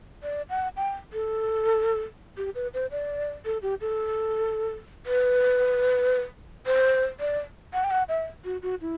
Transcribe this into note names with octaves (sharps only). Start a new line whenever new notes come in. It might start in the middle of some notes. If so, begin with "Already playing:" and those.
D5
F#5
G5
A4
G4
B4
C5
D5
A4
G4
A4
B4
C5
D5
F#5
G5
F#5
E5
F#4
F#4
E4